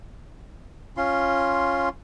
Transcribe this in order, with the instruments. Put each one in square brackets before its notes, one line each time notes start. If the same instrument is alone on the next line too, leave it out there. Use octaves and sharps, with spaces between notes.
[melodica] C#4 F4 C6